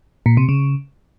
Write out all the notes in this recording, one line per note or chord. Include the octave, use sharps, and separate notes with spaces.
A#2
C3
C#3